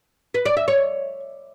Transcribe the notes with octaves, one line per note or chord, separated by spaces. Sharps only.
B4
D5
E5
C#5